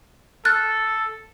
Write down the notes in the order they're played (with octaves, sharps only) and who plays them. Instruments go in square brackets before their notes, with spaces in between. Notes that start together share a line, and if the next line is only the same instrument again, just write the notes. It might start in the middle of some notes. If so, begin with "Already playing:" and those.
[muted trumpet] A4 [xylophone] F6 F#6 A6